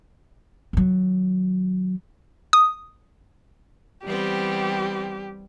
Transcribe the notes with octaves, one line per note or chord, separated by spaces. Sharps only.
D#3 F#3
D#6
E3 G3 B3 C4 G4